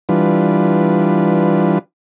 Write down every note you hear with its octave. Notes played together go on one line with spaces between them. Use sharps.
E3 G3 D4 F4 B4